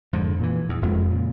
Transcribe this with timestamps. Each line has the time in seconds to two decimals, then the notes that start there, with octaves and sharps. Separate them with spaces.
0.13 F2 G#2 D3
0.40 A#2 D3 E3
0.69 E2
0.82 F1 F2 G#3
1.11 A#2 C#3